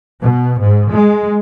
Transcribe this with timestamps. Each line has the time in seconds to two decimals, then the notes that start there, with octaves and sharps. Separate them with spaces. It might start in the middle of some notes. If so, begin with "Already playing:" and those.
0.21 B2
0.60 G#2
0.92 G#3